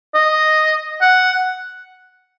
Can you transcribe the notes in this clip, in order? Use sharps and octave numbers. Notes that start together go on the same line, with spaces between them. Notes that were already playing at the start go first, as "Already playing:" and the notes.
D#5
F#5